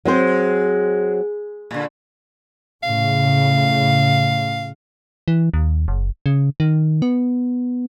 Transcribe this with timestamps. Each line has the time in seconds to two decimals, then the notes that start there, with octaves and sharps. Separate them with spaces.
0.05 F#3 G#3 C4 C5
1.71 A#2 D3
2.83 A2 C#3 F5
5.28 E3
5.54 D#2
5.88 F#1
6.26 C#3
6.60 D#3
7.02 B3